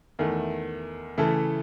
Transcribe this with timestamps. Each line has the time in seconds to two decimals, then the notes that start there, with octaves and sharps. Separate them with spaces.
0.19 E2 D#3 A3
1.18 C#3 E3 A3 E4 A4